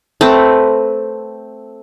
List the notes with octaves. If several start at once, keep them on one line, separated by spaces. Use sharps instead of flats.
A3 C4 B4